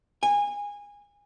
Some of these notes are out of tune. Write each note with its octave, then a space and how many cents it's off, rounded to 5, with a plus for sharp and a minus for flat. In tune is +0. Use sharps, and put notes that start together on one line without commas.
G#5 -20